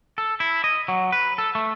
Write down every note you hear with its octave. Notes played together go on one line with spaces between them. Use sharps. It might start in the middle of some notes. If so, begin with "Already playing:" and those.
A4
E4
D#5
F#3
B4
A4
A3